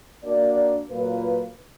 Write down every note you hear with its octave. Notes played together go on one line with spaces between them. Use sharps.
A#3 D4 F#4 D5
A#2 F#3 A#3 F4 B4